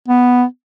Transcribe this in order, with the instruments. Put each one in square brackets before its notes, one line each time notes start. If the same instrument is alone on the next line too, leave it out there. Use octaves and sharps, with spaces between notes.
[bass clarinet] B3